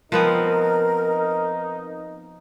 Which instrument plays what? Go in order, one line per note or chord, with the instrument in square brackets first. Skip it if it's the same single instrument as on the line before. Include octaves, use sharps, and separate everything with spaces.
[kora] F3 B3 C4 [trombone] D#4 [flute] A#4